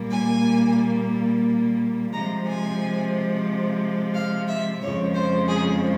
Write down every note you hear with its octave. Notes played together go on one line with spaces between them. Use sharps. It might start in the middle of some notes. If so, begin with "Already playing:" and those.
Already playing: A#2 G3 A#3
G#5
C3 F3 G#3 A#5
G#5
F5
E5
F2 C#3 F3 G#3 C#5
C5
G#4